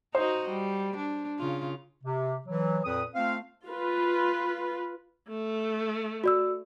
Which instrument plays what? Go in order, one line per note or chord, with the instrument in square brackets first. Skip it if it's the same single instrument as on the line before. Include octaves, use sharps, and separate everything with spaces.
[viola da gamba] D#4 F#4 D#5 [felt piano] C5
[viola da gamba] G3
D4
C#3 F4
[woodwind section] C3
E3 F#3
F2 A#2 B4 D#6
A3 C4 F4 F5
[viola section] F4 B4
[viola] A3
[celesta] F#4 D5 E6